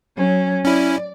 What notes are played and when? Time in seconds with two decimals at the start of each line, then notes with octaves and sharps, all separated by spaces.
0.16 F#3 C#4
0.65 C#4 E4 D5